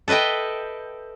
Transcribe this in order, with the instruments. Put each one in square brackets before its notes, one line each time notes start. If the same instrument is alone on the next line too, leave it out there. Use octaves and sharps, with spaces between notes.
[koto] A4 B4 D#5 E5 G5